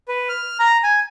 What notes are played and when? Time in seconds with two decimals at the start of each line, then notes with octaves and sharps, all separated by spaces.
0.08 B4
0.29 F6
0.60 A#5
0.83 G#5